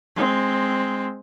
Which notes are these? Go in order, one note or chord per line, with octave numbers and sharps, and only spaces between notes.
G#3 C4